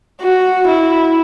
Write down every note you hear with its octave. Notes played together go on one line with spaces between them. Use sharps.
F#4
E4